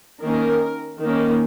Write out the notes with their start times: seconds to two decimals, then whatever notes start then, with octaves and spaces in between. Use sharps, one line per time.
0.23 D#3 A#3 C#4 A#4
1.03 D#3 A#3 C#4